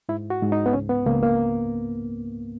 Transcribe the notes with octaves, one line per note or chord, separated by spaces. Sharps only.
G#2 E4
F#4
G#2
D#4
B3
C#2 C#4
B3
C#2 A#3
A#3